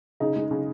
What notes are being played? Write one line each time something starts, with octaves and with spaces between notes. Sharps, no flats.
C#3 D#4 G#4
G#3
C#3